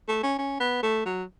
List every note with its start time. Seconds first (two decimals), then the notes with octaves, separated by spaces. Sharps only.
0.09 A3
0.23 C#4
0.38 C#4
0.60 B3
0.83 A3
1.06 F#3